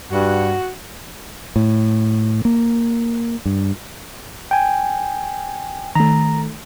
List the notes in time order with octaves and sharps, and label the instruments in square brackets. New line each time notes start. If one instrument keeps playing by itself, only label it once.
[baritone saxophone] G2 [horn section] F#4
[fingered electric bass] A2
A#3
G2
[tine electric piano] G5 G#5
[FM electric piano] D#3 A3 [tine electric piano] A#5